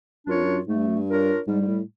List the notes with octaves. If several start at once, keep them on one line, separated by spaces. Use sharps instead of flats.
F#2 D4 F4 A#4 C#5
F2
F#2
G#2 A3
G2
F#2
G2
D4 F4 A#4 C#5
G#2 G3
G#2
A2